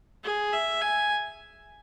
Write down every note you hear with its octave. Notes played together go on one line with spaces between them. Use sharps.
G#4
E5
G#5